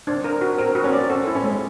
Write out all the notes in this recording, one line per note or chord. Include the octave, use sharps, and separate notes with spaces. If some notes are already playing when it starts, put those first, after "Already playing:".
C4 D4
A#4
F#4
C4 A#4
F#4
C#4
D5
C4 A4
E4
C#4
G#3